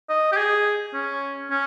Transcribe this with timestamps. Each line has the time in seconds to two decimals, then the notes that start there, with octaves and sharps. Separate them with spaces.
0.09 D#5
0.33 G4
0.37 G#4
0.94 C#4
1.51 C#4